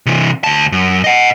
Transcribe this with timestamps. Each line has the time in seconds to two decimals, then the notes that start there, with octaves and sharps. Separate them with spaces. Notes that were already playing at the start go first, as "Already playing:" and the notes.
0.06 C3 E3
0.44 D2 A5
0.72 F#2
1.04 D#5 F#5